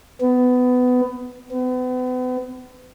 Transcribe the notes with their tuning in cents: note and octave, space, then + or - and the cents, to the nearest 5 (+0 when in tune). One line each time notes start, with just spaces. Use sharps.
B3 +20
B3 +40